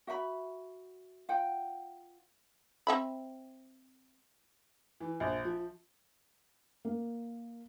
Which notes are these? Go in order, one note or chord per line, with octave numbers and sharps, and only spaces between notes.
F#4 E5 F#5 B5
F4 F#5 G5
C4 E5 B5
E3
A#1
F3
A#3